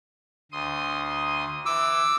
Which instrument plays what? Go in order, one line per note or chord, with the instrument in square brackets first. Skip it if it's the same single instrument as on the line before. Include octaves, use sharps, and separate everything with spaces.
[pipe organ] D2 C6 D#6
[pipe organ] E3 [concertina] D6 E6